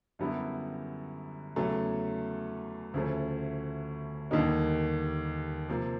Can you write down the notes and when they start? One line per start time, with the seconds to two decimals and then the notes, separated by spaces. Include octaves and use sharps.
0.19 F#2 D3 G3 B3 E4
1.56 E2 C#3 F#3 A3
2.94 D2 C#3 F3 A3
4.31 D#2 D3 G3 A#3 D#4
5.69 C3 F3 A#3